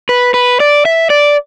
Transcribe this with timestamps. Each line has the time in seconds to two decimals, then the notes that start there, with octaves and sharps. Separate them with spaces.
0.09 B4
0.34 B4
0.60 D5
0.85 E5
1.10 D5